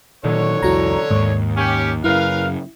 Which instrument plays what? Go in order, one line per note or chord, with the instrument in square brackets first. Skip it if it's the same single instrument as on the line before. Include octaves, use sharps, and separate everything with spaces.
[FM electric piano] A#2 [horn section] D3 C#5 [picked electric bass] D#3 F#3
[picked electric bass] C2 F2 [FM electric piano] E4 F#4 A#5
[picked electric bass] D#2 [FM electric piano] G#2
[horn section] C#4 G4
[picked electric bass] F#2 C#3 [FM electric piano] E4 [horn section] A#4 B4 F5